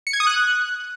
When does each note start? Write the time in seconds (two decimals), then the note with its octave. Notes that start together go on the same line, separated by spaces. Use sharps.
0.07 C#7
0.13 G#6
0.20 D#6
0.27 F#6